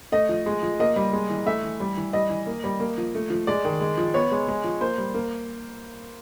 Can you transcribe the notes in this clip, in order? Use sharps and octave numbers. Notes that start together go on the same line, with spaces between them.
A3 D#5
F3
G#3
F3
A#3 D#5
G3
G#3
E3
A3 E5
E3
G3
E3
G3 D#5
E3
A#3
G3
A#3
F3
A3
F3
G#3 D5
D#3
G#3
F3
B3 C#5
G#3
G#3
F3
A#3 C5
G3
A#3